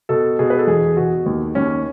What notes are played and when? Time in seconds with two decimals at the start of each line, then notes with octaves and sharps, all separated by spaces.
0.09 B2 A4
0.39 B2 G#4
0.50 B4
0.59 A4
0.67 E2 G#4
0.97 B2 F#4
1.26 D#2
1.55 D#2 C#4